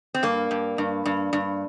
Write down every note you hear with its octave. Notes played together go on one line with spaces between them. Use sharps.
C4
G2 A#3
G2
G2
G2
G2